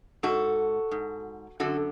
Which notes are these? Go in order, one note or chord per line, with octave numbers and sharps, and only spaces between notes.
G#2 F#4 A4
G#2
F#2 D3 F#4 A4